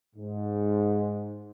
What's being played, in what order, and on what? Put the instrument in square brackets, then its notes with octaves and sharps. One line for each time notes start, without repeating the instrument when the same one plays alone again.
[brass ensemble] G#2